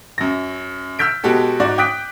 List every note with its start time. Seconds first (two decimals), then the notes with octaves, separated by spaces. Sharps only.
0.18 F#2 A#6
0.99 E6 F6 G6 B6 D7
1.24 B2 G#3 F#4 G4 A4
1.60 G#2 F#4 D5
1.78 G5 D6 D#6 F#6 B6 D7